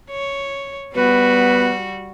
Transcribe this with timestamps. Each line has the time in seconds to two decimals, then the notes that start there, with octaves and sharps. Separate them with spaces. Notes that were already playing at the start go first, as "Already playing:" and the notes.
0.11 C#5
0.95 G3 B3 F#4 B4